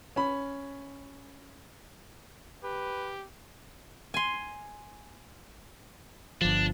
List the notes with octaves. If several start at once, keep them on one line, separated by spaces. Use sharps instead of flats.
C#4 B5
G4 B4
G#5 C6
G1 F3 D4